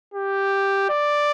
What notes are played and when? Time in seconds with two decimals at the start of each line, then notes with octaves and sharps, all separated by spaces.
0.14 G4
0.90 D5